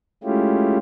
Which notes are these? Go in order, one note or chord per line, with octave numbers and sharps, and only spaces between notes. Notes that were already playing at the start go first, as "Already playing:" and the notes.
G#3 A3 C#4 E4 F4 G4